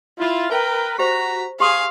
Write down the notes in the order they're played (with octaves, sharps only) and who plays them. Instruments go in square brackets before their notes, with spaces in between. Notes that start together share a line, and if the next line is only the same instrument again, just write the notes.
[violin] E4 [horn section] F4
[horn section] A#4 B4 [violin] G5
[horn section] F#4 A#5 [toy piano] G4 C5 [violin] B6
[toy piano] G4 C6 D#6 [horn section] G#4 [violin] F5